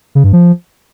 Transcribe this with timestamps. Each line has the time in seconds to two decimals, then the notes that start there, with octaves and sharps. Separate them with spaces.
0.15 C#3
0.24 G2
0.33 F3